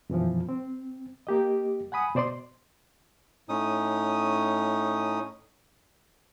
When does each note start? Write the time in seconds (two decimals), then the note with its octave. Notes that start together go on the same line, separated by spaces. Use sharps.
0.10 F#2 B2 E3 F3
0.49 C4
1.27 A#3 G4 D#5
1.92 F#5 G#5 B5 D#6
2.15 B2 C5 D5 D#5 C6
3.49 A2 C#4 D#4 D#6